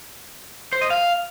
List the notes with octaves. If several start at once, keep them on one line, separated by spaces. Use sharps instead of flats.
C5
D#5
F5